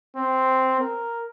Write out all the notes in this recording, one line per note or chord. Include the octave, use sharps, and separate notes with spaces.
C4
A#4